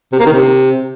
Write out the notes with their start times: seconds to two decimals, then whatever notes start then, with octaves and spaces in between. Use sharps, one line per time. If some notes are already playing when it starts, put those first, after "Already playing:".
0.13 C3
0.19 A#3
0.26 D#3
0.33 C3